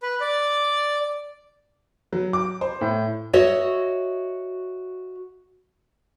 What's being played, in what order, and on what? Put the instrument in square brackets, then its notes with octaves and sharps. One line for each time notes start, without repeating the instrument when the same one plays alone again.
[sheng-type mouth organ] B4
D5
[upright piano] F#3
D6
C5
A2
[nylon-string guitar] F#4 C#5 D#5 E5